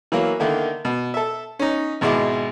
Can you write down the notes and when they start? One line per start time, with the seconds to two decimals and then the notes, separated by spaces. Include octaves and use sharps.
0.12 E3 F#3 A#3
0.40 D3 D#3 A#3 E4
0.85 B2
1.14 A4 E5
1.59 C#4 D#4
2.01 G#1 B2 G#3 E4 D6